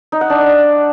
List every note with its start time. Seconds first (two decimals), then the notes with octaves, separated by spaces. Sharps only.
0.12 D#4
0.21 F#5
0.30 D4